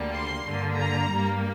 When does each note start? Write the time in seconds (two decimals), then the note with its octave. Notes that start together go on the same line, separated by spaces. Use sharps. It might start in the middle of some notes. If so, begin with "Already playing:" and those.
Already playing: D2 D3 G3 A#3
0.13 C6
0.45 G2 D3 A#3
0.77 A#5
1.11 G2 G3 A#3